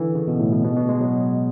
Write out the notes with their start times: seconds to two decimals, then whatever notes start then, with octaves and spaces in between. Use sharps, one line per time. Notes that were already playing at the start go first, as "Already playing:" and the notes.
Already playing: D3 E3
0.15 C#3
0.28 B2
0.39 A2
0.52 B2
0.64 B2
0.77 B2
0.89 G#3
1.01 F#3